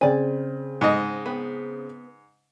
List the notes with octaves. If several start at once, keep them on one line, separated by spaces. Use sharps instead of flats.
C#3 C4 D5 G#5
G#2 D#5
B3